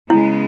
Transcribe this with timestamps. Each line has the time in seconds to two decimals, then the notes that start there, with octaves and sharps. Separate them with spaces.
0.10 C#3 G#3 B3 E4